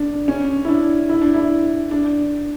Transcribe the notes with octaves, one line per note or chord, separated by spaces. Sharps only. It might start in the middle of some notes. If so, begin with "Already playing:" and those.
Already playing: D4
C#4
E4
D4
E4
D4
E4
D4